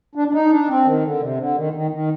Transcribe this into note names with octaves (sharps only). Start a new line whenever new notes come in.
D4
D4
D#4
D4
C4
D#3
D3
C3
D3
D#3
D#3
D#3